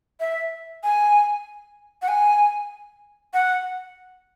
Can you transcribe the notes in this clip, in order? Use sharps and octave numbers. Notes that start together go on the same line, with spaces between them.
E5
G#5
F#5
G#5
F#5